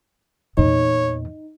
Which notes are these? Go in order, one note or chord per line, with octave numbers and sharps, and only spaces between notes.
E2 A#2 D#4 C#5